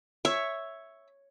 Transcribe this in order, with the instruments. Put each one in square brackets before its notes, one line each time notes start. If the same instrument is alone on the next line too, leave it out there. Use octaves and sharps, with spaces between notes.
[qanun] C#5 [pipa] E5